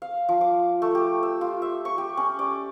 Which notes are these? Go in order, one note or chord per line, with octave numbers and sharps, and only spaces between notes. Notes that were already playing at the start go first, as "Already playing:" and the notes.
F5
F3
D6
A3
G4
E6
F4
E5
C#6
G4
C#4
D5